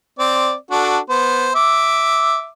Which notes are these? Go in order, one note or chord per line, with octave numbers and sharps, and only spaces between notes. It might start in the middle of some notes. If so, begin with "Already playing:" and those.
C4 D5
D4 F#4 A4
B3 C5
E5 D6